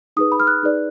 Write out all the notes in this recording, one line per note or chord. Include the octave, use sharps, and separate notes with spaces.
D#4 G#4 B4 D#6
B5
F6
F#6
D#4 G#4 B4 D5